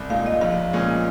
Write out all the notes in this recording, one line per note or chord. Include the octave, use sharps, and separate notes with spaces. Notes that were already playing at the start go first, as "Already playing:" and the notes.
Already playing: C2
A#2 G#3 D#4 F5
D#5
A#1 F5
A#2 G#3 C#4 G#4